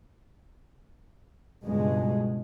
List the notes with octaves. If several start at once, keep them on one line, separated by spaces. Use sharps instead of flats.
C#2 G2 B2 G#3